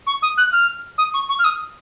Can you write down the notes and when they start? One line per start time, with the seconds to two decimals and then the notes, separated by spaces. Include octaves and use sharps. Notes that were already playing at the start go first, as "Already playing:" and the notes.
0.07 C#6
0.22 D#6
0.38 F#6
0.52 F6
0.98 D#6
1.14 C#6
1.29 C#6
1.39 F6
1.44 D#6